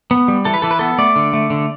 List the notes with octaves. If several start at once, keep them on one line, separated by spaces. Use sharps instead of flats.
B3
G3
E3 A4
B4
E3 A4
B4
B3 A4
A3 D5
D3
A3
D3